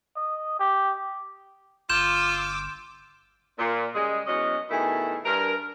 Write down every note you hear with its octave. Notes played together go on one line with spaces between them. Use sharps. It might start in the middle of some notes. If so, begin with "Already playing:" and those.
D#5
G4
G1 F4 C6 D6 E6 G6 E7
A#2
C#3 G3 G#3
E2 F#3 C#4 D#5
B2 D#3 A3 E4 G#4
G2 A#4